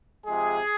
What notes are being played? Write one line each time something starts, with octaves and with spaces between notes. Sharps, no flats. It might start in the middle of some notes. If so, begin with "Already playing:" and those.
C3 F3 G#3 G#4